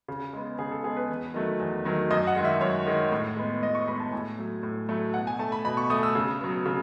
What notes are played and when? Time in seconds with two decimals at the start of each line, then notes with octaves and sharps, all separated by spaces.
0.08 C#3
0.33 G#3 B3
0.59 C#3 G#4
0.72 A4
0.84 G#3 B3 G#4
0.97 B4
1.09 E2
1.34 D#3 F#3 A3
1.60 E2
1.85 D#3 F#3 A3
2.11 F#2 D#5
2.27 F#5
2.36 D#3 G#3
2.45 E5
2.61 F#2 C#5
2.86 D#3 G#3
3.12 A2
3.36 G#3 B3
3.62 A2 D#5
3.75 C#6
3.88 G#3 B3 B5
4.00 A5
4.12 A2 G#5
4.38 F#3 A3
4.63 A2
4.89 F#3 A3
5.14 B2 F#5
5.27 G#5
5.39 A3 A5
5.52 B5
5.65 B2 B5
5.77 C#6
5.90 A3 D#6
6.03 E6
6.15 C#3
6.41 F#3 B3
6.66 C#3